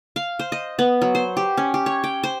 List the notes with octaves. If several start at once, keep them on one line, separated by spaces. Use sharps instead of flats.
F5
C5
D#5
B3
F#3
C5
G4
C#4
G4
C#5
G5
C5